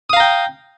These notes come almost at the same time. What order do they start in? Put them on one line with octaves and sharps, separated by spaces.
D#6 F5 A#5 G5